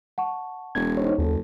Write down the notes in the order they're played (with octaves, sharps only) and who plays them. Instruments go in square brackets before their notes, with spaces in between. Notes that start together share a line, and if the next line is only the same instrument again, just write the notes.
[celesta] F#5 A5 C#6
[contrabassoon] E1 [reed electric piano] G#6
[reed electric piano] D#4 C5 C#5
[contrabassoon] F#1 [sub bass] D#2 [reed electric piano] A4